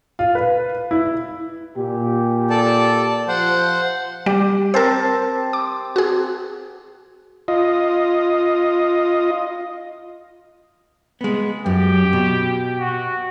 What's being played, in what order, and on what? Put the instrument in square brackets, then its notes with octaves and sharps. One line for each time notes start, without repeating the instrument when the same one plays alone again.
[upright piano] F4
B4
E4
[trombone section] A#2 G4
[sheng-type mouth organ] A4 D5 A5
[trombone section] F3 [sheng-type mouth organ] C5 F#5
[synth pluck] G3 [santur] G4
[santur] C4 A5 [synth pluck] A#4 C5
[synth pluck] D6
F#4 G#4
[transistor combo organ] F4 D#5
[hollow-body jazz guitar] G#3 B3
[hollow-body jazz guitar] F#2 [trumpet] G4
[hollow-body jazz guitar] B2
[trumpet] F#4